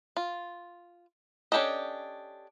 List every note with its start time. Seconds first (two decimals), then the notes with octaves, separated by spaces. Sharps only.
0.17 F4
1.52 C#4 D4 G4 A4 D#5